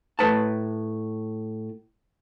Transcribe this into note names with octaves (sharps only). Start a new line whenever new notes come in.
A2 B4 A5